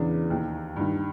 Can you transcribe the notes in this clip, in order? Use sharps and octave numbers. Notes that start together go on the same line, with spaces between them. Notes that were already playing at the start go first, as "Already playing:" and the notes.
Already playing: E2 C#3 E3 D4
D#2 D#3
G2 D#3